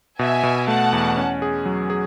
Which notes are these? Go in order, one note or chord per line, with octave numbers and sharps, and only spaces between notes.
B2 E5 G#5
B2
A3 F#5 A5
E2
C#4
G#4
F#3
G#4